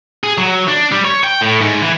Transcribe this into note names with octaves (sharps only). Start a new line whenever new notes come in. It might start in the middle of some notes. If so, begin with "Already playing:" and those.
G#4
F#3
D4
G3
C#5
G5
A2
G#2
E3